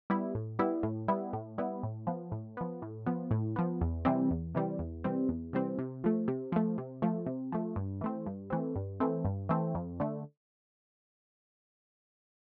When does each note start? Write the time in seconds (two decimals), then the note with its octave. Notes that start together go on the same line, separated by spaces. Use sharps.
0.10 G3 B3 E4
0.35 A2
0.59 G3 B3 E4
0.83 A2
1.08 G3 B3 E4
1.33 A2
1.58 G3 B3 E4
1.83 A2
2.07 F3 B3
2.32 A2
2.57 F3 B3
2.82 A2
3.06 F3 B3
3.31 A2
3.56 F3 B3
3.81 E2
4.05 C3 E3 G3 C4
4.31 E2
4.55 C3 E3 G3 C4
4.79 E2
5.04 C3 E3 G3 C4
5.29 E2
5.53 C3 E3 G3 C4
5.79 C3
6.04 F3 A3
6.28 C3
6.52 F3 A3
6.78 C3
7.02 F3 A3
7.26 C3
7.52 F3 A3
7.76 G2
8.01 E3 A3 C4
8.26 G2
8.50 E3 A3 C4
8.75 G2
9.00 E3 A3 C4
9.25 G2
9.49 E3 A3 C4
9.75 F2
10.00 D3 A3